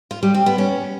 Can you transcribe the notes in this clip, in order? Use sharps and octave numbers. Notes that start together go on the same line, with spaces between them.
F4
G3
C4
B3
C#4